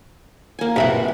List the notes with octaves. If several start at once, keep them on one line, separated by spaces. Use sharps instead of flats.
A#3 G#5
A#1 C3 E3 B4 F#5